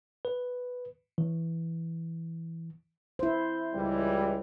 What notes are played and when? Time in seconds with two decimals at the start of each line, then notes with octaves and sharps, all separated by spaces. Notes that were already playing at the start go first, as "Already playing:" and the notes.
0.25 B4
1.18 E3
3.19 E4 C5
3.74 C#2 E3 G3